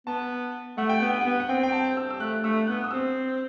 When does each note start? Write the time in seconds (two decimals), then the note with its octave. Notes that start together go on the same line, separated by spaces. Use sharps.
0.07 B3 A5
0.78 A3 F#5
0.89 G5
1.00 B3 F#5
1.10 G5
1.21 B3 F#5
1.40 F#5
1.49 C4 G5
1.63 G5
1.72 A5
1.97 E6
2.10 E6
2.20 A3 F#6
2.44 A3 E6
2.67 B3 F#6
2.84 D#6
2.91 C4 E6